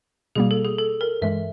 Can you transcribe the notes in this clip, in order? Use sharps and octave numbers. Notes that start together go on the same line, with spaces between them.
B2 G3 A#3 G#4
A4
G#4
A4
A#4
G2 E3 G#3 E5